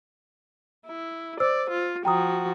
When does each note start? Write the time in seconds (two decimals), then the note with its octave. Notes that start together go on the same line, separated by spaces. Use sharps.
0.87 E4
1.40 C5 D5 E6
1.70 F4
2.05 F3 F#4 G5 A#5 D#6